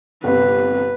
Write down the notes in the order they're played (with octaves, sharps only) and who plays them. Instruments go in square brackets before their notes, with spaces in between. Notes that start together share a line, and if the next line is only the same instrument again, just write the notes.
[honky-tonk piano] G1 C3 [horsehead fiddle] B4